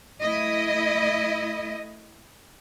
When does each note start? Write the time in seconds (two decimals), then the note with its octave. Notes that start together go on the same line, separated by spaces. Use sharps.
0.22 A3 E4 D#5